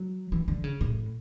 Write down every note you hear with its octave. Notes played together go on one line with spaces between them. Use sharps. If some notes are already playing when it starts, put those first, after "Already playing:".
Already playing: F#3
E3
D3
C#3
A2